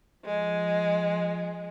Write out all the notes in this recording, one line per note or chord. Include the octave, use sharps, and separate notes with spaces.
F3 G#3